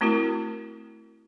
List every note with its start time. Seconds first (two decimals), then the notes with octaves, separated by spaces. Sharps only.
0.01 A3 C4 E4 F#4 A#4